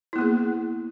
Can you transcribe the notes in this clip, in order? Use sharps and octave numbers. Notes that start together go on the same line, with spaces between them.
A#3 B3 E4 G#4